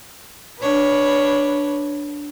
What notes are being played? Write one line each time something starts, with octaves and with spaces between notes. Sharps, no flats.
D4 B4 C#5